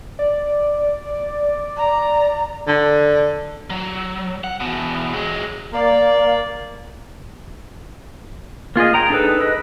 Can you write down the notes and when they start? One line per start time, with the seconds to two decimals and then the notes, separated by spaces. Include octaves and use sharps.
0.19 D5
1.77 A#5
2.67 D3
3.70 F#3
4.44 F#5
4.60 E2 B2
5.13 F#3 G#3
5.73 A#3 D5
8.76 A#3 F4 G#4 D#5
8.93 G5 A#5 D#6
9.10 D4 D#4 G#4 A4 B4
9.40 B4 D#5